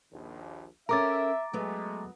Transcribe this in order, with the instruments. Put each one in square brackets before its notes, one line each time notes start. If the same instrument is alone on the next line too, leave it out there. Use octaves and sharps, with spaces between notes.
[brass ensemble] A#1 D#2
[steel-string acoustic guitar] C#4 A4 A#4 [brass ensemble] E5 [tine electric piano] A#5 D6 A6
[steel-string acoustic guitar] F#3 B3 [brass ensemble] G#3 A3